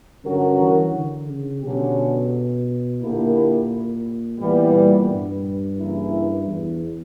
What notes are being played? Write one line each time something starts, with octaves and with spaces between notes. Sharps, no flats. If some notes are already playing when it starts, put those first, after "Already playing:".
G2 D3 F#3 C#4 F#4 A#4
E3
D3
C#3
B2 D3 F#3 C#4 G4
A#2 D3 A#3 E4 G4 A#4
A#2 E3 G3 B3
A#2
G2
C#3 E3 A#3 E4
E2